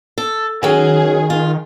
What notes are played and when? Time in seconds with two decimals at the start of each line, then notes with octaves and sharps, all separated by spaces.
0.18 A4
0.63 D#3 F#3 C#4 G#4
1.30 F4